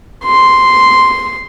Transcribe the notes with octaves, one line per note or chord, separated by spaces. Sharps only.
C6